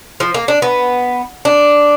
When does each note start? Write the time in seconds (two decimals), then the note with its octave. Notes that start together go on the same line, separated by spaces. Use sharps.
0.20 F3
0.34 A#3
0.48 D4
0.62 B3
1.45 D4